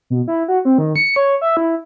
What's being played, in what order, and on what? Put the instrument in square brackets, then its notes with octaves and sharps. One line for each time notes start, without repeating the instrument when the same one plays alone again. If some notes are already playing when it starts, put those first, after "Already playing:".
[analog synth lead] B2
E4
F#4
C4
D#3
C#7
C#5
E5
E4